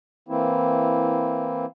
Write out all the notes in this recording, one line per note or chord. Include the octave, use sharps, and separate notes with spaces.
E3 A#3 C4 E4